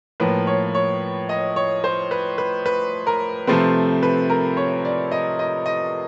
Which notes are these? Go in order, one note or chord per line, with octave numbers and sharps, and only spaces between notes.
A2 F3 A#3 B4
C#5
C#5
D#5
C#5
C5
B4
B4
B4
A#4
C3 F3 A3 C4 B4
B4
A#4
C#5
D5
D#5
D#5
D#5